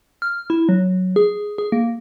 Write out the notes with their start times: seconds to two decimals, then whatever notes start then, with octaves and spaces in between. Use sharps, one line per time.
0.22 F6
0.50 E4
0.69 F#3
1.16 G#4
1.58 G#4
1.72 A#3